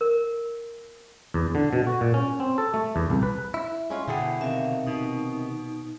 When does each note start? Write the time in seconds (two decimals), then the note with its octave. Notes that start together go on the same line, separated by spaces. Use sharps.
0.01 A#4
1.34 E2
1.55 D3
1.73 B2
1.87 F#4
2.01 A#2
2.14 C#4
2.40 C4
2.58 A4
2.74 A3
2.96 E2
3.10 C2
3.23 B4
3.54 E4
3.90 G#3 C#4 F4
4.08 B2 D3 E4 G#4 F#5 G5
4.41 C3 D#3 E5 F5
4.87 B2 D#4